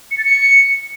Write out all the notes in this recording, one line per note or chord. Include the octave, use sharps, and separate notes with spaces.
C#7
A6
C#7